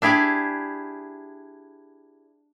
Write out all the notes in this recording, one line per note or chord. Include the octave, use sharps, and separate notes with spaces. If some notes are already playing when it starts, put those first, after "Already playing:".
D4 E4 G4 G#4 D5